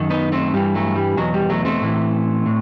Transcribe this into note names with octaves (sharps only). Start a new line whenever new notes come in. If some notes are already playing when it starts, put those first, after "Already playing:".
Already playing: F#2 D#3
B3 D#4
A3 C4
G2 E3 G3
F#3 A3
G3
E2 B2 F#3
G3
F#3 A3
A3 C4
A2 E3
A2